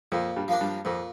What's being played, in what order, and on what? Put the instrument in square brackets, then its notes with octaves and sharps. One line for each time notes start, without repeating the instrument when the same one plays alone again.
[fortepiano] F2 F3 [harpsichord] A#2
[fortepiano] G2 G3
[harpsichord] F3 A#3 D4
[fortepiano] G2 G3
[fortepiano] F2 F3 [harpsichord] A#2